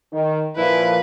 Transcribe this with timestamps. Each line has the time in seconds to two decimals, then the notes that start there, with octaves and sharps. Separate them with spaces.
0.13 D#3
0.57 A#2 F3 E4 B4